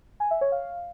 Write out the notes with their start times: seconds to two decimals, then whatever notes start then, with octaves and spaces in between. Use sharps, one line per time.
0.20 G#5
0.31 E5
0.41 C#5
0.52 F5